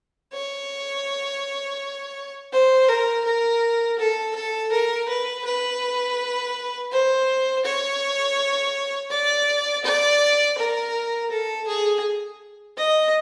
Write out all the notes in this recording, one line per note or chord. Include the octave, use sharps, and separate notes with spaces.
C#5
C5
A#4
A#4
A4
A4
A#4
B4
B4
C5
C#5
D5
D5
A#4
A4
G#4
D#5